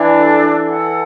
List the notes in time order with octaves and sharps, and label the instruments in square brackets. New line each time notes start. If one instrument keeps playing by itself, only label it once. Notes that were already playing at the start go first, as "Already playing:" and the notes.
Already playing: [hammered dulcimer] E3 [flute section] D4
[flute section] A4
A4
F#5